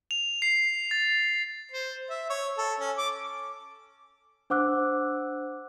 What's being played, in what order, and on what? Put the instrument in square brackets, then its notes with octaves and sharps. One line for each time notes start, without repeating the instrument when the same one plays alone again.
[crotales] F7
C7
A6
[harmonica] C5
E5
C#5
A4
C#4
D6
[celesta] D4 C5 F#5 D6 E6 F#6